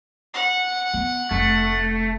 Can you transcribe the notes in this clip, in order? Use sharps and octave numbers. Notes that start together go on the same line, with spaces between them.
F#5
B3
F1 A3